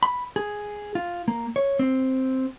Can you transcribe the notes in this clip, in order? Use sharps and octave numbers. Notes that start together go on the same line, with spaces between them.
B5
G#4
F4
A#3
C#5
C4